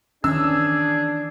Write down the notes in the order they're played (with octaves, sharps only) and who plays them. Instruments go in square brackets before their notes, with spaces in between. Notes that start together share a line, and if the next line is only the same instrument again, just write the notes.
[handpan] D#3 E3 C#4 [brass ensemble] D4 [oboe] G#4 [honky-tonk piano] E6